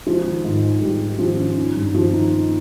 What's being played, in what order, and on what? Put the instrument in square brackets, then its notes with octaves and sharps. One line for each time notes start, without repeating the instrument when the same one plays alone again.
[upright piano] F3 [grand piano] G#3
[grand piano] D#3
G#2
D#3
[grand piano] G#2 [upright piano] G3
[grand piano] D#3
[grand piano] D#3 [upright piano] F3
[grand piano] C#4
D#4
G2
[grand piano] D#3 [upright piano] F3
[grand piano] D#4
A#3